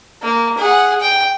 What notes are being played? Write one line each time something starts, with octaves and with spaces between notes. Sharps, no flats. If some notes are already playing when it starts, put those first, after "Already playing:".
A#3
G#4 F#5
G5